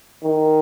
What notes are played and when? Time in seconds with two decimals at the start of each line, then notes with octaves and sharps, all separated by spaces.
0.24 D#3